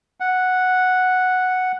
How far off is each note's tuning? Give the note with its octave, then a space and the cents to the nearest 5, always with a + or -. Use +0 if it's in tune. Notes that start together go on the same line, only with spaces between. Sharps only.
F#5 -5